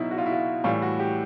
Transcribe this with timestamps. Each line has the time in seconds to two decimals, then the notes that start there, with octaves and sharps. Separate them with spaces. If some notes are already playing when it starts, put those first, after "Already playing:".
Already playing: B2 F#3 D#4 E4
0.11 F#4
0.18 F4
0.26 E4
0.32 F4
0.64 A2 E3 G3 F4
0.82 F#4
1.00 G4